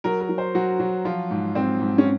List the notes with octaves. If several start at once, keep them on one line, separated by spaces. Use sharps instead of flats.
F#3 A#4
A#4
F#3
C5
F#3 F#4
F#3
F3 F4
G#2
G#2 C4
G#2
C#4